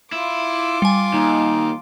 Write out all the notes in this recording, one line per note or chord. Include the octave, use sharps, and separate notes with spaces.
E4 F4 D6
G3 G#5
D#2 D#4